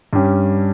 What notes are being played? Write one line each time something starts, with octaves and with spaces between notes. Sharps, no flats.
G2 G3 C#4 G4